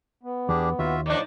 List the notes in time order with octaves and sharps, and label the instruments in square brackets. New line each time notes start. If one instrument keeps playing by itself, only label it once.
[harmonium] B3
[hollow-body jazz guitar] E2 [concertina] D4 G4 G#4
[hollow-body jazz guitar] D#2 [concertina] F4 F#4 E5
[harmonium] A2 F3 [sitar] D#3 D4 [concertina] D5